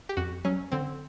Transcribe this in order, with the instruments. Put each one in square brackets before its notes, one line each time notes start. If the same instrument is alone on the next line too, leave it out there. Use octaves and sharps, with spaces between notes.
[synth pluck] G4
[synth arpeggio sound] F2 [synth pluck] F#4
[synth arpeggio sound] F#3 [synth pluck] C#4
[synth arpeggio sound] D3 [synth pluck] C4